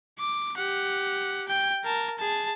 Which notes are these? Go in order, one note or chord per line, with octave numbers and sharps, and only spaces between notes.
D6
G4 F#5
G5
A#4 A5
G#4 A5